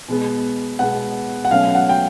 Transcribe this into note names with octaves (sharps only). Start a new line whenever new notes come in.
B2 G#3 B3
B2 G#3 B3 F#5
F#5
B2 F#3 A3 C#4 F5
F#5
G5